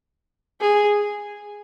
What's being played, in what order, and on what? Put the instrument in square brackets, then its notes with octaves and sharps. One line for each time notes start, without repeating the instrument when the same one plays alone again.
[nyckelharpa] G#4